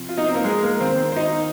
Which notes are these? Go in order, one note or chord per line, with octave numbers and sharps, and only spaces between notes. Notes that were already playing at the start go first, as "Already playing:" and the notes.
Already playing: C3 F3
F4
D#4 D#5
C4 C5
A#3 A#4
G#3 G#4
A#3 A#4
D#3 A#3 C4 C5
C5
D#4 D#5